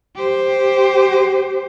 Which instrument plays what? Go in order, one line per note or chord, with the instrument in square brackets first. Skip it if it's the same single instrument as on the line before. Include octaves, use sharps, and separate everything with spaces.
[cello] G4 C5